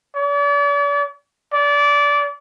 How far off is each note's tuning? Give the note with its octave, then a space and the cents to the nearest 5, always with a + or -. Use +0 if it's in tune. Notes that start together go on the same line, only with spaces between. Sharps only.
D5 -40
D5 -25